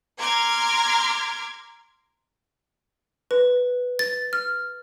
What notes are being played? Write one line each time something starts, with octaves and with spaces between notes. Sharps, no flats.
A#5 C6 D6 F6 G#6
B4
A6
F6